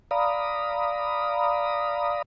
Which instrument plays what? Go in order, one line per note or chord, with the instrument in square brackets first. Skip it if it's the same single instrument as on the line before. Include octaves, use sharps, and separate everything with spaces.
[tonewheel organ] D5 F5 A#5 B5 D#6